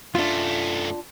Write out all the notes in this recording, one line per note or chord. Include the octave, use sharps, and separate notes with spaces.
F#2 A3 D4 F4